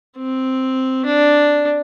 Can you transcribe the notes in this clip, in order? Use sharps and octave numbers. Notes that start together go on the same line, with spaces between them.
C4
D4